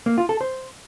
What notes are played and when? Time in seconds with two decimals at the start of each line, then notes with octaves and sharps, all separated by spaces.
0.06 A#3
0.18 F4
0.29 A4
0.41 C5